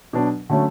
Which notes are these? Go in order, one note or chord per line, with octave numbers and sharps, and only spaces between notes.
B2 F#3 B3 D4
D3 F#3 A3 C#4